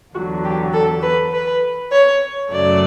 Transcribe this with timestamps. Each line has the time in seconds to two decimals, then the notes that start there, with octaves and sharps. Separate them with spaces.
0.13 E2 D3 F#3 F#4
0.43 G4
0.73 A4
1.02 B4
1.32 B4
1.91 C#5
2.51 F#2 C#3 F#3 A3 D5